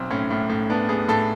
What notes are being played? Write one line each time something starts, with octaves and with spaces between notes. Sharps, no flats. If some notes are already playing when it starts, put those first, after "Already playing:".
Already playing: B1 C4
A2 C#4
A2
A2
B3 D4
B3 G#4
A2 A4